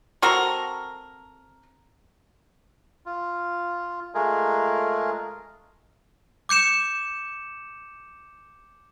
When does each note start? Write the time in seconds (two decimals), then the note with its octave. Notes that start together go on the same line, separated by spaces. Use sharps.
0.22 C4 F#4 A4 A#4
3.06 F4
4.15 G#3 A3 F4 G#4 A#4
6.49 D6 G6 C#7 E7